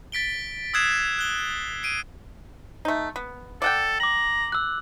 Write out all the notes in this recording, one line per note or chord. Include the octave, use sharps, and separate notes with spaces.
A6 B6 D7 G7
D#6 E6 F#6 G#6 C7 E7
F#6 G7
C7 D7 D#7
A3 D#4
B3
A4 D5 F#5 G5
A#5 D6 F#7
E6 F#6